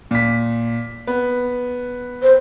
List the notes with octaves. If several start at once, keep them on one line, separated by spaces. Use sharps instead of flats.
A#2 B6
B3
C5